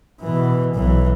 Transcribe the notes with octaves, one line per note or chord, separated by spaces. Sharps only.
B2 E3
B1 E3